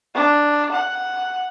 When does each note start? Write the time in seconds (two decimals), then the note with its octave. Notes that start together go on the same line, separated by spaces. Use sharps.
0.14 D4
0.71 F#5